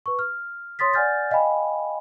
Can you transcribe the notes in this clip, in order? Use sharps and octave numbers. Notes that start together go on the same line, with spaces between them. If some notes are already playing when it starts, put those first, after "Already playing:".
B4 C#6
F6
C#5 C6 D#6 A6 B6
D5 F#5 G#5 F6 G6 A6
D#5 F5 G5 G#5 B5